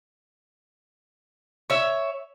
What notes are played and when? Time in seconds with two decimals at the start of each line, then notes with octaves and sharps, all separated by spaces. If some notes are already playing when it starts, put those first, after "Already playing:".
1.70 C#5 E5